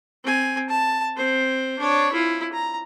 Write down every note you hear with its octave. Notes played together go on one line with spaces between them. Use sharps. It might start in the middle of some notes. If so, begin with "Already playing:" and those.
C4 G#5
A5
C4 C5
D4 C#5
E4 F4
A#5